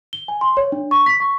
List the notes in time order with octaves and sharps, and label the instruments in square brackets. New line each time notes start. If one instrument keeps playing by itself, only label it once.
[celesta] G7
G#5
C6
C#5
D4
C#6
B6
C#6